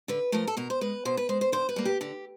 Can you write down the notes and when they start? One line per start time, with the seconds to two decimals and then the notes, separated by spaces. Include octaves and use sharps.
0.08 D3 B4
0.32 F3 A3 A#4
0.47 A4
0.57 B2 A#4
0.70 C5
0.81 G#3 B4
1.05 B2 C5
1.17 B4
1.29 G#3 C5
1.41 C5
1.52 D3 C5
1.69 B4
1.76 G3 A#3
1.85 G4
2.01 D3 G4